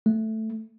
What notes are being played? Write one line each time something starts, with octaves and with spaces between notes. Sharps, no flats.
A3